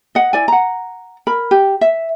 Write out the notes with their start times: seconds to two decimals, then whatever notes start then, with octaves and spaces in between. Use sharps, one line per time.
0.15 D#5 F#5
0.33 E4 D5 G#5
0.48 F#5 A#5
1.27 A#4 B5
1.51 G4
1.81 E5